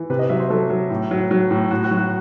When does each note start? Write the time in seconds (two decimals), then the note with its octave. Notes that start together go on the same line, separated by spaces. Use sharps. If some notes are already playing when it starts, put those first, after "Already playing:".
Already playing: E3
0.10 C3 B4
0.19 D#5
0.29 F#3 E5
0.40 C5
0.50 F#3 A4
0.70 F#3
0.90 A2
1.11 F#3
1.31 F#3
1.51 A2
1.71 A2 F#4
1.84 F#4
1.91 F#3
1.97 F#4